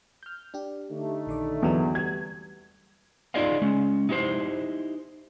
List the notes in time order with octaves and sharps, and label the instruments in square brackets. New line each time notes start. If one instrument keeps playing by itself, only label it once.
[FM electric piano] F6 G6
D4 G4
[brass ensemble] D3 A3 D#4
[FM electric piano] A#1 D#3 D5
[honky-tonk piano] E2 [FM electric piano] E3 F#3
[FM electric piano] G3 [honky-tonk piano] G#6
[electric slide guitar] D#4 F4 G#4 D5 D#5 F5
G#3 C#4
D#4 E4 G4 A4 C5